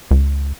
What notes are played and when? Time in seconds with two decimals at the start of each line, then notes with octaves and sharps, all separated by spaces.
0.11 C#2